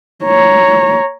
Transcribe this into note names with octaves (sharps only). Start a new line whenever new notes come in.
C#5 A#5